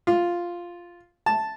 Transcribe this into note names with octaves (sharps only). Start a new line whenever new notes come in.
F4
A5